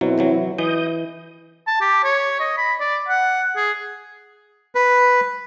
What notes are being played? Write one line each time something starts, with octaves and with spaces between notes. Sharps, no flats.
B2 F#3 C4 E4
C3 E3 F#3
E3 D#5 D#6 G6
A5
G4
C#5
D#5
B5
D5
F#5
G#4
B4